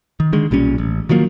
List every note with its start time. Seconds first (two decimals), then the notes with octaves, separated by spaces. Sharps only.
0.20 D#3
0.33 D3 D#3 G#3
0.51 B1 A#2 G3 C#4
0.78 A1
1.09 D#3 F3 F#3 A#3